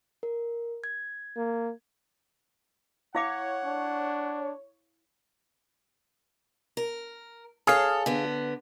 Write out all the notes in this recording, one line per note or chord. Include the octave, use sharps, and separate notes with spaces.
A#4
G#6
A#3
E4 C#5 F5 F#5 D6
D4
A#4
G#4 A4 C#5 F5
D3 B3